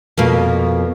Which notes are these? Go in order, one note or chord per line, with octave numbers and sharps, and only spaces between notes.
F2 B2 A#3